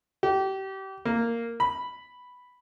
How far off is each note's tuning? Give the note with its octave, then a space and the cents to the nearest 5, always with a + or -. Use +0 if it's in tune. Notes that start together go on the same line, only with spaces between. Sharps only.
G4 -30
A#3 -5
B5 +0